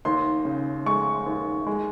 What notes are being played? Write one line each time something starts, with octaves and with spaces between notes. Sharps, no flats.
D#2 C6
C#3
G#3 C#6
D#2
G#3